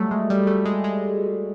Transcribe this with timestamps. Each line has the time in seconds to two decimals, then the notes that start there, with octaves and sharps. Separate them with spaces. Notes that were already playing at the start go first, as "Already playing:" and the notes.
Already playing: F#3 G3 A3
0.11 G#3
0.30 G3
0.47 A3
0.65 G#3
0.84 G#3